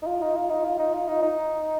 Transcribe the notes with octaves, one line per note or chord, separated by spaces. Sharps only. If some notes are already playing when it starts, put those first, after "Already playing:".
D#4
F4
D#4
F4
D#4
F4
D#4
F4
D#4
D#4